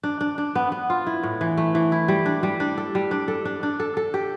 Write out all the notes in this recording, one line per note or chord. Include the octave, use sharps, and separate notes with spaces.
D4
D4
D4
B3
B3
F4
E4
A2
E3
A3
E3
E4
G3
D4
G3
D4
A4
G3
D4
A4
D4
D4
A4
A4
G4